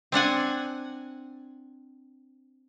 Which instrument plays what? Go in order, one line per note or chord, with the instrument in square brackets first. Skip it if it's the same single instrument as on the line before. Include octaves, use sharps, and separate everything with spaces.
[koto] C4 D4 F#5 G#5